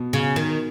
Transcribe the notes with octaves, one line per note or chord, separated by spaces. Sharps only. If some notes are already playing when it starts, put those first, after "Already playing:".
Already playing: B2
C#3
D#3